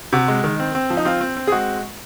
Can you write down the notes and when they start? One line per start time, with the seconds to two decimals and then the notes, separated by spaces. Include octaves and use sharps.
0.13 C3 F#4
0.28 G#3
0.44 D#3
0.60 C4
0.75 C4
0.90 F3
0.97 D#4
1.05 C4 F4
1.21 C4
1.37 C4
1.47 G#4
1.52 G#3 F#4